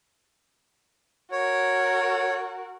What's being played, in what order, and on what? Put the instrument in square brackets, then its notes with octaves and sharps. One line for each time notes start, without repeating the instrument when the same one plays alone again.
[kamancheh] F#4 A#4 [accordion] C#5